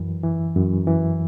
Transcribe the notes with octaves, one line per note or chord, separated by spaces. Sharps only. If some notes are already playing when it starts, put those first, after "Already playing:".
Already playing: F#2 E3
E3
F#2
E3